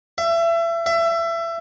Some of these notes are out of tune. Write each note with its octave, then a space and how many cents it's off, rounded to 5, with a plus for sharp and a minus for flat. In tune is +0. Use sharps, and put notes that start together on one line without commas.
E5 +30
E5 +25